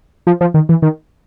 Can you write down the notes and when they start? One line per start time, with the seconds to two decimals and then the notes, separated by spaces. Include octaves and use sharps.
0.27 F3
0.41 F3
0.54 D#3
0.69 E3
0.82 D#3